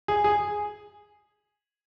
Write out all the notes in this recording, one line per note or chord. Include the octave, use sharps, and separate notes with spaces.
G#4
G#4